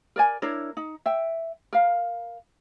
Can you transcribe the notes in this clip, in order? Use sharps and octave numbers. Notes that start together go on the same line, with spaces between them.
A#4 D5 G#5
D4 E4 A#4 C#5
D#4
E5 G5
A#4 F5